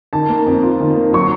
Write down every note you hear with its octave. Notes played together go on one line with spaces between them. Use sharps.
D#3 A5
A#3
F2
F4
D#3
A#3
F#3 C#6